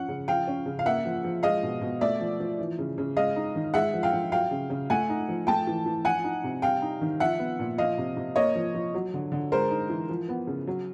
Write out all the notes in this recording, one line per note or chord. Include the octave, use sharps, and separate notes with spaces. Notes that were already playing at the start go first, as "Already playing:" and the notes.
Already playing: F3 C#4 F#5
C#3
F3 F5 G5
C#4
C#3
F5
A#3 E5 F#5
F3
F3
G#3 D#5 F5
B2
B2
A3 D5 E5
F3
F3
E3
C#3
C#3
G#3 D#5 F5
D#4
D#3
G#3 E5 F#5
F3
F5 G5
F3
F#3 F5 G5
C#3
C#3
A3 F#5 G#5
D#4
F3
A3 G5 A5
E3
E3
F3 F#5 G#5
D#4
C3
G3 F5 G5
D#4
D#3
F3 E5 F#5
B3
A#2
F3 D#5 F5
C3
C3
A#3 C#5 D#5
F3
F3
F#3
D3
D3
G#3 A#4 C5
D#4
E3
F3
B3
C#3
F#3